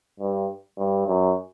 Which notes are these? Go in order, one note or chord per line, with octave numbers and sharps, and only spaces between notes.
G2
G2
F#2